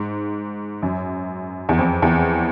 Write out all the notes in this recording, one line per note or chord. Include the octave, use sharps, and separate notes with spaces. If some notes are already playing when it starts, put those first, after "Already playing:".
Already playing: G#2
F#2
E2
F2
E2